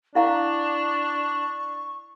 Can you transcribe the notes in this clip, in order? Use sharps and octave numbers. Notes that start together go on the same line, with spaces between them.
D4 E4 F5 A#5 C#6